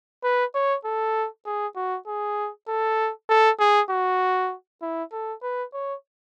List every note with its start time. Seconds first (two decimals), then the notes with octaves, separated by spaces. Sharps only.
0.24 B4
0.55 C#5
0.85 A4
1.46 G#4
1.76 F#4
2.07 G#4
2.68 A4
3.29 A4
3.60 G#4
3.90 F#4
4.82 E4
5.12 A4
5.42 B4
5.73 C#5